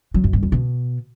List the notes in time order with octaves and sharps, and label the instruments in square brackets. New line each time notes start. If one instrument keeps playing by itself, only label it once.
[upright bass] F#3
F#2
G2
E2
B2